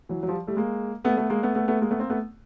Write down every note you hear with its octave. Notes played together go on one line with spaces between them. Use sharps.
E3 F#3
F#3
F3 G3
G3 A3
G#3 A#3
A3 B3
A3 B3
G#3 A#3
A3 B3
A3 B3
A3 B3
G#3 A#3
A3 B3
A#3 C4
A3 B3